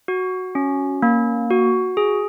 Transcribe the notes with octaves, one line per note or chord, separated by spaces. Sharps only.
F#4
C#4
A#3
F#4
G#4